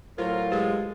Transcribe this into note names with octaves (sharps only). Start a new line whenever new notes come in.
A2 F#3 F4 A#4 C5
G#3 G4 B4